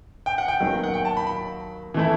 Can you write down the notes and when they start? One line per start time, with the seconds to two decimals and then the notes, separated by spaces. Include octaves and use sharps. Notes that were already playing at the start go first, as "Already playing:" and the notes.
0.26 G5
0.38 F#5
0.48 G5
0.60 D#2 D#3 F#3 B3 D#4
0.83 F#5
0.94 G5
1.05 A5
1.17 B5
1.27 B5
1.94 E3 A3 E4